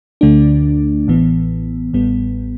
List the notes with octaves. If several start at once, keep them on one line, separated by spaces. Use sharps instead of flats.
D2 D3 A3 D4
A1 A2 E3 B3
A1 A2 G3 B3